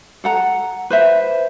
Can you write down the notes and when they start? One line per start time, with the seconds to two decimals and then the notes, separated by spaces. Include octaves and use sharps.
0.24 A4 F#5 A#5
0.90 B4 C5 E5